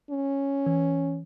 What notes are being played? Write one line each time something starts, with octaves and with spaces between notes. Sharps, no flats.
C#4
E3